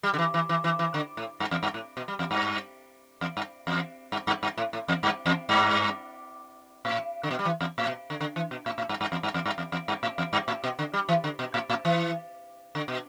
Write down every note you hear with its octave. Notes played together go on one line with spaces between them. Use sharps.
G3
D3
E3
E3
E3
E3
E3
D3
A2
G2
E2
G2
A2
B2
G3
E2
G2
E2
G2
E2
G2
G2
G2
A2
A2
E2
G2
E2
G2
A2
D3
B2
G3
E3
E2
A2
B2
D3
D3
E3
B2
A2
A2
G2
G2
E2
G2
E2
G2
E2
E2
G2
A2
E2
G2
A2
B2
D3
G3
E3
D3
B2
A2
A2
E3
D3
B2